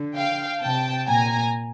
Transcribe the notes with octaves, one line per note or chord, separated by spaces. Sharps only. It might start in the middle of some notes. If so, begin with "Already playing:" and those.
Already playing: D3
F5 G5
C3 G5 A5
A#2 G#5 A#5